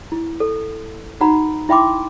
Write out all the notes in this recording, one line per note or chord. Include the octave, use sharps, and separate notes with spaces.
E4
A4
D#4 F#4 F#5 A#5 B5
E4 E5 G5 B5 C6 D6